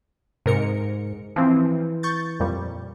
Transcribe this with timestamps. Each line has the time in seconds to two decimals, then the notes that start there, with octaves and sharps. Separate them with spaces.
0.46 G#2 C3 A#4 C#7
1.36 E3 F3 C4
2.03 C#6 G6 A6
2.40 F2 A#2 G3